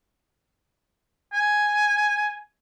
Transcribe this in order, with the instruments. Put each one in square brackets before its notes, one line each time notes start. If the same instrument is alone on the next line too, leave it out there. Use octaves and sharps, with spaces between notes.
[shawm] G#5